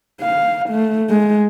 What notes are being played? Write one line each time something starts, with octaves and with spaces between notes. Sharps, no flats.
F5
A3
G#3